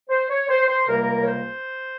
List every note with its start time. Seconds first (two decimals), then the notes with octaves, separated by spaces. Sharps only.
0.09 C5
0.30 C#5
0.49 C5
0.68 C5
0.88 C#2 C3 G3 A#3 A#4
1.20 C#5
1.27 C5